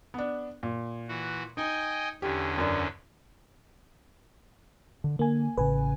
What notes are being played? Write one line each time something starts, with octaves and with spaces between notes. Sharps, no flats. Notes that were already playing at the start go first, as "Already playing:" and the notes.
B3 D4
A#2
E3 F#4
D#4 D#5 G5 G#5
E2 D3 C#4 G4
F#2 D4
D3
D3 A#3 G#5
A1 C#3 B4 G#5